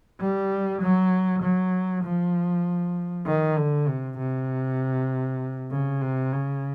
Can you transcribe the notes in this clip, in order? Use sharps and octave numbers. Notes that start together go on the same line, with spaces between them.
G3
F#3
F#3
F3
D#3
D3
C3
C3
C#3
C3
C#3